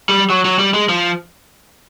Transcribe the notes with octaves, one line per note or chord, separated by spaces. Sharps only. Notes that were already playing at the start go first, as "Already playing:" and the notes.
G3
F#3
F#3
G3
G#3
F3